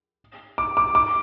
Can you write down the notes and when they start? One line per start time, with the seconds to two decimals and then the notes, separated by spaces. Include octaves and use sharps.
0.58 D6
0.77 D6
0.95 D6